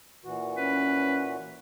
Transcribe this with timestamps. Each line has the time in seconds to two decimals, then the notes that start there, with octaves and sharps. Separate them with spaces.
0.25 A#2 E3 F#4
0.58 C#4 B4